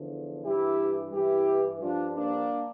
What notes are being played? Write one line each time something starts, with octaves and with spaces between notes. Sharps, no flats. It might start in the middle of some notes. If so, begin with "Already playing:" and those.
Already playing: E2 D3 F3
G2 E3 E4 G4
G2 E3 E4 G4
G2 F3 D4 F4
A#3 D4